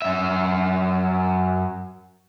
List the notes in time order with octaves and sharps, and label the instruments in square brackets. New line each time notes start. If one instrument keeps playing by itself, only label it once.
[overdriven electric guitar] F#2 E5